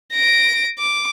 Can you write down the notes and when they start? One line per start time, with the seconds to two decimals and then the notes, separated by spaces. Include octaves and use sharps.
0.13 A#6 D7
0.79 D6